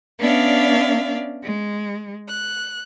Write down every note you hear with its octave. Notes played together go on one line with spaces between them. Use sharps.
B3 C#4 D4 D5 E5 F5
G#3
F#6